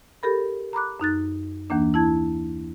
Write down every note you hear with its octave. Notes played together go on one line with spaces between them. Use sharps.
G4 A4 A#4 B5
A#5 B5 D6 F#6
F#2 D#4 F#6 A6
D#2 E3 A#3 D4
E4 A5 G#6